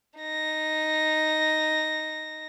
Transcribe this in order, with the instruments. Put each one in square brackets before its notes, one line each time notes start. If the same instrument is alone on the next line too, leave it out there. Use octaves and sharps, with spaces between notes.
[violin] D#4 A#6